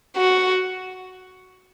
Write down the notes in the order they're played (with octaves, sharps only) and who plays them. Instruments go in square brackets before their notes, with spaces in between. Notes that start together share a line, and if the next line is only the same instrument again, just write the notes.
[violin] F#4